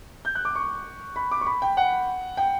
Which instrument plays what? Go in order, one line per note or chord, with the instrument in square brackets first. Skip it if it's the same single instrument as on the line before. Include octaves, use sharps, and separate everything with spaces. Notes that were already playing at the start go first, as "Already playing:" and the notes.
[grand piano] G6
F#6
D6
C#6
B5
D6
C#6
B5
G5
F#5
G5